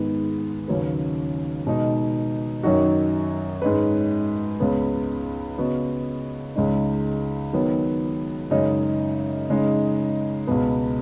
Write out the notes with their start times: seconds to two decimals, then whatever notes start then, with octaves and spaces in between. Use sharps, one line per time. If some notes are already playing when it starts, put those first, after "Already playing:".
Already playing: G#2 D#3 B3 G#4
0.68 D#2 C#3 F#3 C#4 B4
1.67 B2 G#3 D#4
2.63 F#2 D#3 F#3 D#4 F#4
3.62 G#2 G#3 C#4 B4
4.60 C#2 C#3 B3
5.58 C#3 B3 F#4 D#5
6.56 C#2 C#3 G#3 D#4
7.53 D#3 F#3 B3
8.51 F#2 C#3 G#3 D#4
9.50 C#3 G#3 D#4
10.47 C#2 B2 B3